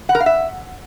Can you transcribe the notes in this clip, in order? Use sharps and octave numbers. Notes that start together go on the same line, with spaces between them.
F#5
A#4
F5
E5